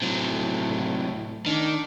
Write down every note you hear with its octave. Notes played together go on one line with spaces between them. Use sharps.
A2 C3 F#3
D#3 D4